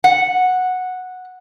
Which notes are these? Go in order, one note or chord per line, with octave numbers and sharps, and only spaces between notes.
F#5